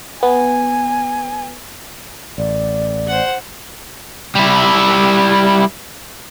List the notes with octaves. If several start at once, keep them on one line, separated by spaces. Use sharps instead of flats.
B3 G#5
A1 D5
C5 F#5
G3 E4